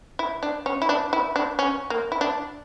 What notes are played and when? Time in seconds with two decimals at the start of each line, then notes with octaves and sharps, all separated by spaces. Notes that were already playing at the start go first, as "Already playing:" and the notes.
0.19 E4
0.43 D4
0.66 C#4
0.82 E4
0.89 D4
1.13 E4
1.36 D4
1.59 C#4
1.90 A#3
2.12 E4
2.21 D4